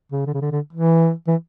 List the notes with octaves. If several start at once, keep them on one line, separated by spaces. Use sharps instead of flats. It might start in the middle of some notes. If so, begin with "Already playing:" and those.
C#3
D3
C#3
D3
D3
E3
E3